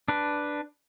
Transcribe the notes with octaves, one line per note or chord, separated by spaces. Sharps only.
D4 B4